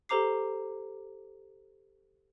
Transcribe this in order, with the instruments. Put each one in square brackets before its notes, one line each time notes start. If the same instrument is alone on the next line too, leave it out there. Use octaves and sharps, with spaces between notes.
[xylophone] G4 A4 C5 A#5 D6 C7